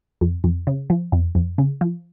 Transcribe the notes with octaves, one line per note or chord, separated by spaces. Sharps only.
F2
F2
C#3
F3
F2
F2
C#3
F3